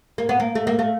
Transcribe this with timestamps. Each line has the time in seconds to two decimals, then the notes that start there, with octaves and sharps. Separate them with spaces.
0.18 A#3
0.29 B3
0.40 A#3
0.55 A3
0.67 A#3
0.79 A3